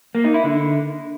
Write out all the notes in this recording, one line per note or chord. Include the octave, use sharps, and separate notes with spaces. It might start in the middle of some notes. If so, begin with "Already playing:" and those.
A#3
D#4
E4
D3